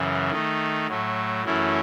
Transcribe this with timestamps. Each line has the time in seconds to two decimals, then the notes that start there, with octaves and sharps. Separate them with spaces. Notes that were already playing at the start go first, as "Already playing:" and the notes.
Already playing: F#2 C#3 E3
0.30 D#3 A3 D#4
0.88 A2 F#3 A3
1.44 F#2 E3 A3 C#4 E4